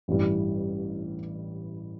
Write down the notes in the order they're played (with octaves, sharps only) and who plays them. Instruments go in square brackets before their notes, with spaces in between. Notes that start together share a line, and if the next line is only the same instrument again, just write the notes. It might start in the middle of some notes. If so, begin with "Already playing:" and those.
[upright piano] A1 G2 E3 G3